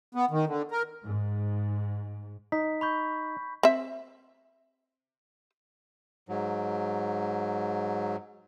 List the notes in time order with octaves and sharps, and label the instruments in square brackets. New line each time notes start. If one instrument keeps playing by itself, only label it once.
[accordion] B3
D#3
D3
A#4
[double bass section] G#2
[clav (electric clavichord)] D#4 [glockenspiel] B6
[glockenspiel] B5 C#6 G6
[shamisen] C4 E5
[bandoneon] G#2 F#3